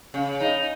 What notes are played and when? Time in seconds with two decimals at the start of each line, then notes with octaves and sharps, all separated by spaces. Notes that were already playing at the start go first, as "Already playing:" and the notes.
0.14 C#3
0.40 D#4